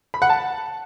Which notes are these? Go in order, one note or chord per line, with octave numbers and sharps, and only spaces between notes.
B5
F#5
A5